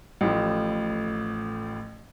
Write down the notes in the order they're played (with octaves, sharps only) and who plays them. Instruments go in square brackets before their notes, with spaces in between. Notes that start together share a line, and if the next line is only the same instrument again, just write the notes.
[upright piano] A1 A2 F3